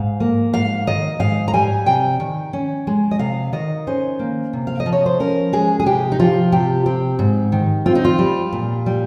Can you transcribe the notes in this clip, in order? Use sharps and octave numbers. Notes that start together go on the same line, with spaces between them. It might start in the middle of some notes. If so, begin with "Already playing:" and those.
Already playing: G#2 F5
A#3
G#2 F5
D#3 D#5
G#2 F5
A#5
G3 G#5
C3 G5
D#3
C#4
G#3
D#5
C3 F5
D#3 D#5
C#4 C5
A#3
C3
F5
D#5
F3
C#5
C5
C#4 A#4
G#3 G#4
G#4
C3 G4
D#4
F3 F4
C3 G4
C4
G#2
D#3
C4 F4
D#4
F4
G3
A#2
G3